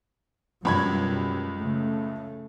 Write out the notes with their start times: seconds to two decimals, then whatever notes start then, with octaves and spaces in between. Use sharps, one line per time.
0.65 C#2 F#2 B2 G3 B5 G#6
1.55 C#3 A3